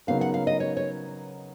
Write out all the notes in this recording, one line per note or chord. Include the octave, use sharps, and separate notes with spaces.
C#3 F#3 B3 D#4 A#4 F5
F#5
F5
D#5
C#5
C#5